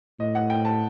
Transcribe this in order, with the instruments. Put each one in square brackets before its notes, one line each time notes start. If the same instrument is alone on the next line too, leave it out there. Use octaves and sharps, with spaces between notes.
[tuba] A2 [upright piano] D#5
[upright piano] F#5
G5
A5